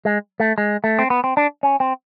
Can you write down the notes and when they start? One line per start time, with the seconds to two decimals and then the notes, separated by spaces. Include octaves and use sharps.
0.05 G#3
0.40 A3
0.58 G#3
0.84 A3
0.99 C4
1.10 B3
1.24 C4
1.37 D4
1.63 C#4
1.80 C4